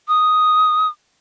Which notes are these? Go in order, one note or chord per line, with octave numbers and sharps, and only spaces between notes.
D#6